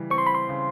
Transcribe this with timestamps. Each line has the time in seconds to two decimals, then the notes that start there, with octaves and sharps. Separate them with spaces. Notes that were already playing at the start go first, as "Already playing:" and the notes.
Already playing: C#3 E3 G3
0.10 C4 C#6
0.18 C6
0.27 B5
0.35 C6
0.49 C#3